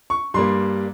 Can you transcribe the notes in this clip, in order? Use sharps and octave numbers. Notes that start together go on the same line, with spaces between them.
C#6
G2 G3 A#3 C6